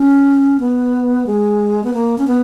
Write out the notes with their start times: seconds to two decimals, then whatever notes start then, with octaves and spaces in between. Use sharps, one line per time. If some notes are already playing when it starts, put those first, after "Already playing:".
Already playing: C#4
0.60 B3
1.27 G#3
1.84 B3
1.94 A#3
2.18 C#4
2.27 B3